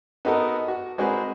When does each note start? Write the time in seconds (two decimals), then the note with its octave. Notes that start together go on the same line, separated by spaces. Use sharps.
0.25 B3 D#4 F#4 A4 A#4
0.68 F#4
0.98 G#3 C4 F#4 A#4 B4